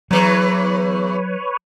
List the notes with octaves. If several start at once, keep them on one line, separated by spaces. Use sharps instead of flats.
E2 E3 F#3 B4 C#5